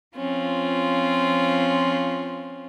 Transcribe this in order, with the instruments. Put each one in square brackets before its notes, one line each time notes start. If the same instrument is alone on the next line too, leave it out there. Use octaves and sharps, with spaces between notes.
[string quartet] F3 C4 C#4 F4